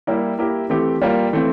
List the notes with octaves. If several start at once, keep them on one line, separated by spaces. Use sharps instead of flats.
G3 A#3 E4
A#3 E4 G4 A#4
E3 A3 C4 G4
G3 A#3 F4
E3 A3 C4